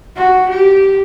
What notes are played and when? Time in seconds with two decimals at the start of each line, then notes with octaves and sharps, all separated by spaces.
0.16 F#4
0.49 G4